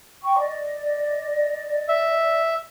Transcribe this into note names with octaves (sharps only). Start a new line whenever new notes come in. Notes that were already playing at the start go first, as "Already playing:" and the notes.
G5 C#6
D5 D#5
E5